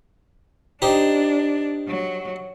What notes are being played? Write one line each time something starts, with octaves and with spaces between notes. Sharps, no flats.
D4 D#4 G4 C5
F#3